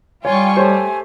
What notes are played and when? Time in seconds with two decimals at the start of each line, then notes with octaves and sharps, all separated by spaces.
0.25 G3 F4 C#5 G5 G#5 C#6
0.57 A3 G4 C5 C#5